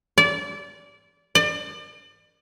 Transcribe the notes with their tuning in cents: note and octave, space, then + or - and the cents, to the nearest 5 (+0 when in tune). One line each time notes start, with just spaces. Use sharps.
D5 -25
D5 +35